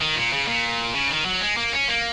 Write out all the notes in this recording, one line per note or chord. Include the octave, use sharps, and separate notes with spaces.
D#3
A#2
C#3
A#2
C#3
D#3
F#3
G#3
A#3
C#4
A#3